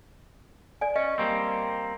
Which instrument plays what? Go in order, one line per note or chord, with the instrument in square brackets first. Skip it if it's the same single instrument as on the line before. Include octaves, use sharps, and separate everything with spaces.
[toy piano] D5 G#5
[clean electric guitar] C#4 [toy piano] D#5
[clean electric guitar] G3 A#3 C4